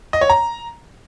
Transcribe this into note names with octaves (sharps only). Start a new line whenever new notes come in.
D#5
C#5
A#5